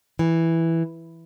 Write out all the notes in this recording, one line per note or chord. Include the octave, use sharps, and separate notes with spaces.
E3